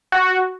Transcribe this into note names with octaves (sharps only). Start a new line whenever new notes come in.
F#4